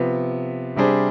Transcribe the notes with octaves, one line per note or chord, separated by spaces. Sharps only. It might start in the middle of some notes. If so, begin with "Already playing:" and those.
Already playing: C3 F3 B3
C3 G3 D4 G#4 C5